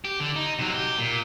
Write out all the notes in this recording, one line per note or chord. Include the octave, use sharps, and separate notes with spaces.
G4
D3
D#4
C3 F#3
G4
A#2